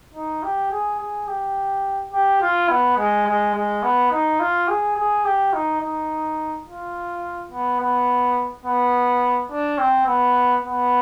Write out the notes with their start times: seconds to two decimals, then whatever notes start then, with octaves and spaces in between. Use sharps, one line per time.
0.14 D#4
0.43 G4
0.72 G#4
1.00 G#4
1.28 G4
2.13 G4
2.42 F4
2.70 B3
2.98 G#3
3.27 G#3
3.55 G#3
3.83 B3
4.12 D#4
4.40 F4
4.68 G#4
4.97 G#4
5.25 G4
5.54 D#4
5.82 D#4
6.67 F4
7.52 B3
7.80 B3
8.66 B3
9.51 D4
9.79 C4
10.07 B3
10.64 B3